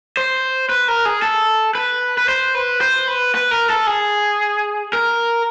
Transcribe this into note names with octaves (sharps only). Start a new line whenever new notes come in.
C5
B4
A#4
G#4
A4
B4
B4
C5
B4
C5
B4
B4
A#4
A4
G#4
A#4